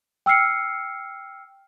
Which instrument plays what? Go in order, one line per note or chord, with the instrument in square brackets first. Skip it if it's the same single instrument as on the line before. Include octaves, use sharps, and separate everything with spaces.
[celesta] G5 E6 F6 C7 C#7